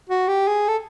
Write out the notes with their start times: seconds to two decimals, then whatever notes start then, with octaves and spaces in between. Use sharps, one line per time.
0.09 F#4
0.28 G4
0.48 G#4
0.68 A4